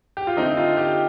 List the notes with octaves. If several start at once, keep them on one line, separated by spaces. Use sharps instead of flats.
G4
F4
D3 A3 C4 D#4
F4
G4